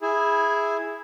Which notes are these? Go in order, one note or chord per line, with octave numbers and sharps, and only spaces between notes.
E4 G#4